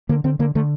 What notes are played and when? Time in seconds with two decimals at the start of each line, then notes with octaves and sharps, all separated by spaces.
0.09 D3 A#3
0.24 D3 C4
0.39 D3 A#3
0.55 D3 A3